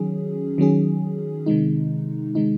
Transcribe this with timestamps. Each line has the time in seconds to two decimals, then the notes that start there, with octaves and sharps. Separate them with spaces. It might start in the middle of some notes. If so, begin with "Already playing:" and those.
Already playing: D#3 F#3 C#4 G#4
0.58 D#3 F#3 C#4 G#4
1.46 C3 D#3 G#3 D#4
2.35 C3 D#3 G#3 D#4